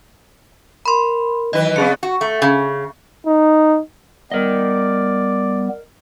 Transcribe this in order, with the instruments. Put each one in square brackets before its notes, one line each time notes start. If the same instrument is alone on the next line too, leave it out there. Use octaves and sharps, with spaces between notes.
[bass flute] A#4 [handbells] B5 C6
[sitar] D#3 E3 B4 [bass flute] F#3 [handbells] D#5
[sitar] C#3 B3 [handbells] C4 G#4 C#7
[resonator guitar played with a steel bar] F#4
A3
C#3
[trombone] D#4
[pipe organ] G3 B3 [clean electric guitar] A#4 D#5 [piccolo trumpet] D5